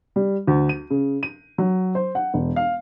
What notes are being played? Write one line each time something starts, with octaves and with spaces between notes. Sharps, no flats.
G3
D2
D#7
C#3
D#7
F#3
C5
F#5
E1
F5